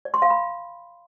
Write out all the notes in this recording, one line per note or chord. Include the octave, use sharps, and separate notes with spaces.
D5
C6
F5
B5